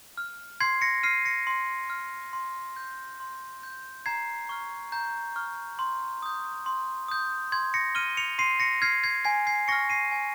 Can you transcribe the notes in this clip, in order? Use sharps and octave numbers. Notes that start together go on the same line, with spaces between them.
F6
C6 G#6 C7
A#6 C#7
F6 C7 D#7
A#6 C#7
C6
F6
C6
G6
C6
G6
A#5 G#6 C7
C#6 F6
A#5 G6
C#6 F6
C6
D#6 G6
C6
D#6 G6
C6 G#6
A#6 C#7
F6 D#7 G7
C#7 F7
C6 C7 D#7
A#6 C#7
F6 G#6 C7
G#6 C7
G#5 G#6 C7
G#6 C7
C#6 F6 A#6 C#7
C7 D#7
G#5